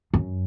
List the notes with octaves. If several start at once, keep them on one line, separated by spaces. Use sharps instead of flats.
F#2